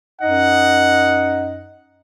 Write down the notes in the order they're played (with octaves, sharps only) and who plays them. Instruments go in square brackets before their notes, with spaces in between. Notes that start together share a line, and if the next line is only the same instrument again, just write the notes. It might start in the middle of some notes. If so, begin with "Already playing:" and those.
[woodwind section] F#2 D#4 D#5 [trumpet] F#5